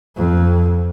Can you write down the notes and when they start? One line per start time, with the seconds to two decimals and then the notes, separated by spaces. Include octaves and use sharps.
0.17 F2